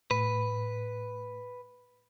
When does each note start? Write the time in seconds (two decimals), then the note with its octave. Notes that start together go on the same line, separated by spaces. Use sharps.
0.11 A2 B4